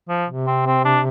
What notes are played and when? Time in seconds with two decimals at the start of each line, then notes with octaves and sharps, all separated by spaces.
0.08 F3
0.28 C3
0.47 C4
0.66 C4
0.85 D4